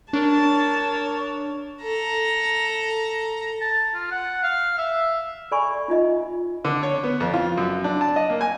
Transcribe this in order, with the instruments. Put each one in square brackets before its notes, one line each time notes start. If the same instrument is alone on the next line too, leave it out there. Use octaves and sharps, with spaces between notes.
[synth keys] D4 [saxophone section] A#4 C#5 [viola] A5
[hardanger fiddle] A4 A#5
[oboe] A5
F4
F#5
F5
E5
[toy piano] A4 D5 G#5 B5 C#6
D#4 F4 D#5 E5
[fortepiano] D3
C#5
B3
F2
F4
F#2
D4
A5
D#5
A#3
G#5